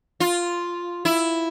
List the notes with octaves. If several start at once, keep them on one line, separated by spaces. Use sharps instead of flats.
F4
E4